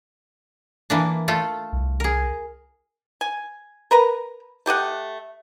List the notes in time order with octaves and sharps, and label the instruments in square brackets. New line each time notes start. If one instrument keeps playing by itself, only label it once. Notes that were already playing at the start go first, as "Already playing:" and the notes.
[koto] E3 A#3 D4
A3 F4 A4
[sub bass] C2
[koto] G#4 A#4
[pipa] G#5
A#4 B4 A#5
A3 G4 D#5 F#5